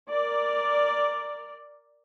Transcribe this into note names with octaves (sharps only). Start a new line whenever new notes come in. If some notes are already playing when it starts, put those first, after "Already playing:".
A#4 D5